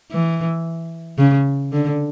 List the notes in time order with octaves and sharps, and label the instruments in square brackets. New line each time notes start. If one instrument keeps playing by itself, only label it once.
[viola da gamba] E3
C#3
D3